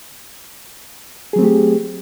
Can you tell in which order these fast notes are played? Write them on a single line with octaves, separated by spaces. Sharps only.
G#4 F#3 C4 A3 G4